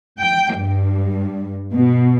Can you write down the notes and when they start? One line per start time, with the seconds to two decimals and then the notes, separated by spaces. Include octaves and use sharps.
0.21 G5
0.58 G2
1.73 B2